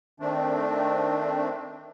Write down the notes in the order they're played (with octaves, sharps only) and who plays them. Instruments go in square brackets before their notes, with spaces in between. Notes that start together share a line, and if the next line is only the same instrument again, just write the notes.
[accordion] D#3 A3 C4 D4